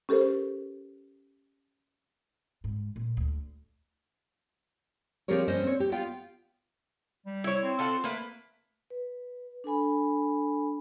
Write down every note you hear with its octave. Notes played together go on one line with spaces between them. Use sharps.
C#4 G4 A4 A#4 C5
G#2
A#2
D2
F3 C4 G4 G#4 A#4 C#5
G2 C#4 C5 D#5
C4 C#5
G4
B3 F4 F5 G5
G3
E4 C#5
C4
F4 A4 F#5
A3 A#3 B4
B4
D4 A4 G#5 B5